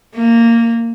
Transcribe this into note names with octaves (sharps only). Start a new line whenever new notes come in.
A#3